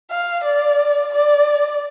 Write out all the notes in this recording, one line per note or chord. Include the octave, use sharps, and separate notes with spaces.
F5
D5
D5